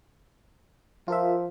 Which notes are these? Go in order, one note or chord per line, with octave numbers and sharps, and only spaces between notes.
F3 F4 A#4 E5